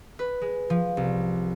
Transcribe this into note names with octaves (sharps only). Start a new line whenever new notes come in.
B4
G#3
F3
C2